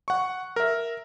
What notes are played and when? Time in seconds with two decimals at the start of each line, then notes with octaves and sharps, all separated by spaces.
0.08 F#5 C#6
0.56 A#4 E5